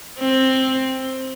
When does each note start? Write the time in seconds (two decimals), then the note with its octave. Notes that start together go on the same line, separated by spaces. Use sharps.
0.19 C4